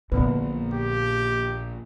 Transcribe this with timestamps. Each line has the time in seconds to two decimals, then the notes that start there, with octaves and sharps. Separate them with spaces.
0.12 A#1 A#2 D3 B3 B4
0.74 G4